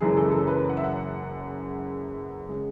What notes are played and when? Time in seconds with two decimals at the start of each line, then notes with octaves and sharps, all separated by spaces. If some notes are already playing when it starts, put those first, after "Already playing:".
0.01 F#1 F#2 E3 G#3 G#4
0.17 A4
0.31 A4
0.47 B4
0.69 F#5
0.77 E5
0.84 F#5
2.48 C#3 G#3